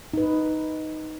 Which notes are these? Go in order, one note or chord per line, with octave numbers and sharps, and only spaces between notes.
D#4 B4